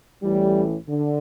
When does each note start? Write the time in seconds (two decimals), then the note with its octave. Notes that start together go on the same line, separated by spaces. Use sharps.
0.23 A1 A2 E3 G3
0.89 D3